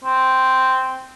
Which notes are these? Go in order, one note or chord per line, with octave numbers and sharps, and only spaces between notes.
C4